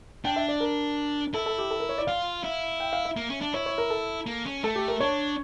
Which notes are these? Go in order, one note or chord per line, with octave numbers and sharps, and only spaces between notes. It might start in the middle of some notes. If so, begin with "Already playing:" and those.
D4 G5
E5
D5
A#4
E4 A4
A4
G4
A4
A#4
C#5
D5
F4 F5
E4
G5
F5
E5
A#3
C#4
D4
E4 C#5
C#5
A#4
A4
A#3
C#4
A3 A4
G4
A#4
D4 C#5